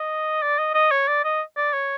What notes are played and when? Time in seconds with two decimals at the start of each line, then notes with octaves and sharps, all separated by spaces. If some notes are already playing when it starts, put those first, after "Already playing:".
Already playing: D#5
0.42 D5
0.58 D#5
0.74 D#5
0.91 C#5
1.08 D5
1.24 D#5
1.57 D5
1.73 C#5